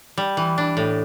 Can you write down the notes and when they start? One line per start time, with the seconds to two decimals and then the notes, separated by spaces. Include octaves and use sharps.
0.18 G3
0.37 E3
0.58 D4
0.77 A2